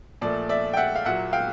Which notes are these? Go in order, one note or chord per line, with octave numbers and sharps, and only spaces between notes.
A#2 F3 A3 D5
D5 E5
G5
E5 F#5
F5
A#2 F#3 A#3 E5 F#5
F5 G5